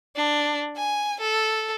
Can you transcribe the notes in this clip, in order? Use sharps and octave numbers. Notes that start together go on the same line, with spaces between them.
D4
G#5
A4